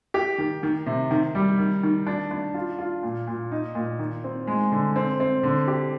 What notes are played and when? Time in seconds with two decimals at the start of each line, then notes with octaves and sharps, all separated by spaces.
0.14 G4
0.38 D#3
0.63 D#3
0.86 C3
1.11 D#3
1.35 G3
1.59 D#3
1.83 D#3
2.06 D4
2.31 D4
2.54 F4
2.78 F4
3.03 A#2
3.27 A#2
3.51 D#4
3.75 A#2
3.99 D#3
4.24 C4
4.47 G#3
4.72 D3
4.96 C4
5.20 C4
5.43 D3
5.68 G4